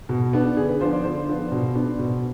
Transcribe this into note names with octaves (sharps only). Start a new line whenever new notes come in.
B2
B3 D4
D3 G#4
B4
F3 B3 D4 C5
D5
D3 C5
F3 B3 D4
B2
B3 D4
B2